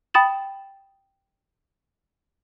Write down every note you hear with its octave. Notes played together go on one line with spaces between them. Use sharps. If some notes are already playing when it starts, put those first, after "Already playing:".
G5 B5 D#6 A6 E7 F#7